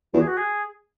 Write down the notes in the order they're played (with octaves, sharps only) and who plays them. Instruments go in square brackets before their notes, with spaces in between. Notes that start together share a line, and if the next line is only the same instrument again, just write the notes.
[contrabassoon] E2 [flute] F#4
[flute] G#4
F#4
G#4